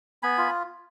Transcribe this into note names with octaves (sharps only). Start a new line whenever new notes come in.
B3 G#5 B5
F4